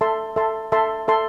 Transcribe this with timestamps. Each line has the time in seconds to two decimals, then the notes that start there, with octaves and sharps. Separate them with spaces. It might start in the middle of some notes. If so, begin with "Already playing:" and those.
0.01 A4 E5 A5 C6
0.36 A4 E5 A5 C6
0.72 A4 E5 A5 C6
1.08 A4 E5 A5 C6